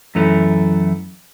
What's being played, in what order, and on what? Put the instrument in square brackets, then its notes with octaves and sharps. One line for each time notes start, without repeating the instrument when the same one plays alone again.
[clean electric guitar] F#2 E3 A3 C#4 E4